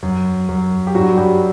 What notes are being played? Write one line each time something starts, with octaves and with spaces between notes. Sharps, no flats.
F#2
F#2
G4
G2 F#3 F#4
G3 G4